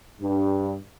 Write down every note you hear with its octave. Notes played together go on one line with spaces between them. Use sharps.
G2